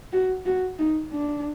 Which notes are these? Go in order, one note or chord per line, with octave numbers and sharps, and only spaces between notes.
F#4
F#4
D#4
D4